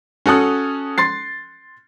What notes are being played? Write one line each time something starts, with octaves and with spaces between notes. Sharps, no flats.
C#4 F#4 A4 D#6 F#6
C6 A6 C7